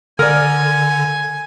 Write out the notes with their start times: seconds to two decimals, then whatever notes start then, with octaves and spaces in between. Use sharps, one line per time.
0.19 D3 A#4 D5 G#5